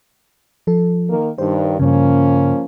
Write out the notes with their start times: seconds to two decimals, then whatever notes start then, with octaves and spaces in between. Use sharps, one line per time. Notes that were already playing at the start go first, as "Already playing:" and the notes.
0.67 F3 A4
1.09 D#3 A#3 A#4
1.38 G2 D#3 C5
1.80 G2 C#3 F3 A#3 C#4